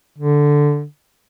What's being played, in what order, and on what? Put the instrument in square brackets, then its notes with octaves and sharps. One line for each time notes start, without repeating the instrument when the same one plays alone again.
[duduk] D3